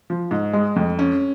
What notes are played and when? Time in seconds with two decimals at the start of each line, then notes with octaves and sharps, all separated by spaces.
0.10 F3
0.31 G#2
0.53 G#3
0.76 F2
0.99 C#4